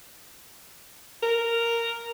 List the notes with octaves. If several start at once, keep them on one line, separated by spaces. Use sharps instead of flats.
A#4